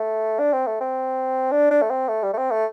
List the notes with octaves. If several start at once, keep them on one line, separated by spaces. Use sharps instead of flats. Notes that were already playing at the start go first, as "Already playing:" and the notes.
Already playing: A3
D4
C4
A3
C4
D4
D4
A3
C4
A3
G3
A3
C4
A3